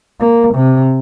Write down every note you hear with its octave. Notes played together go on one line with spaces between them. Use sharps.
A#3
C3